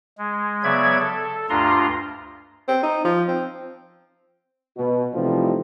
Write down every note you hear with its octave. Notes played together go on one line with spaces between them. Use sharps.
G#3
C#3 F#3 B3 D5 E5 G#6
A4
D2 G2 D4 F4 A#5 C6
C4
D#4
F3
C4
B2
C3 E3 F3 G3 A3 D#4